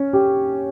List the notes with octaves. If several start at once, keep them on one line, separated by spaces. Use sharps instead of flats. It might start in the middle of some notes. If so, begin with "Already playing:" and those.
Already playing: C#4
G4